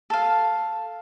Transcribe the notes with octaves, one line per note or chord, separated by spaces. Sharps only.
A4 F5